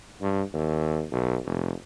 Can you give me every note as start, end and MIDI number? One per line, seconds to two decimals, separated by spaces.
0.22 0.43 43
0.54 1.03 39
1.12 1.38 35
1.46 1.73 29